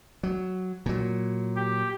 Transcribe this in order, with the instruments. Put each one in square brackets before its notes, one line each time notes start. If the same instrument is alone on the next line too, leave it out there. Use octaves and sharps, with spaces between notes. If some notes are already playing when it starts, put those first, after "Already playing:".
[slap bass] F#3
A#2 F#3
[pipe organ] G4